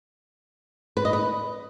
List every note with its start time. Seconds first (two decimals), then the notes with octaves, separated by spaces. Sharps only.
0.97 B4
1.05 D#5
1.13 B4